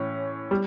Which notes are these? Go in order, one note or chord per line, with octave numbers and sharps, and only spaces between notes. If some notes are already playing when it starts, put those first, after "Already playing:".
Already playing: A2 E3 C#4
G3